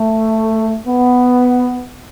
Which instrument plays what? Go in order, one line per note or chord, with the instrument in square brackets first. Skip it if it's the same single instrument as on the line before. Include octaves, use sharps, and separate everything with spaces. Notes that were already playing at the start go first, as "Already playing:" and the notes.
Already playing: [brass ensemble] A3
B3